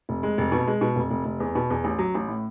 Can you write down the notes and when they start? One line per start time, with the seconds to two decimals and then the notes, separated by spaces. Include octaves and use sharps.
0.09 F1
0.23 G#3
0.38 F1
0.52 B2
0.67 G#3
0.81 B2
0.96 F1
1.11 F1
1.25 F1
1.40 E2
1.55 B2
1.70 E2
1.84 A1
1.99 F#3
2.15 A1
2.28 A2